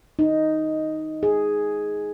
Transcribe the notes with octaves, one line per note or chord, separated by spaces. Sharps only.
D#4
G#4